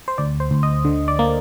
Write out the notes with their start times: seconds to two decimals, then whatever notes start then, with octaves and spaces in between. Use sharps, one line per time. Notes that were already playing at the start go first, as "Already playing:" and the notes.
0.08 C5
0.18 D2 D5
0.40 C5
0.51 D2
0.63 D#5
0.85 D3
1.08 D5
1.19 A#3